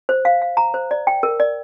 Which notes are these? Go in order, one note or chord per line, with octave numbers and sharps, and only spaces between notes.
C5
F5
F5
A#5
C5
D5
G5
A#4
D5